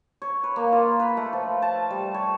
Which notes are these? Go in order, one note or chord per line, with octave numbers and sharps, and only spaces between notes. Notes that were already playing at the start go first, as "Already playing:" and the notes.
C#5
B4
A#3
F4
B4
A3
F3
A5
G3
C#5